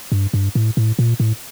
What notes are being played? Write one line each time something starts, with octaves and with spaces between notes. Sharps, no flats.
G2
G2
A2
A2
A#2
A2